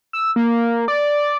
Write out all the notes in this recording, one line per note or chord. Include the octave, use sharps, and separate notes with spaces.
E6
A#3
D5